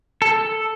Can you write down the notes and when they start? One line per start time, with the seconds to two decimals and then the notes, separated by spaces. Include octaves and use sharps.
0.22 A4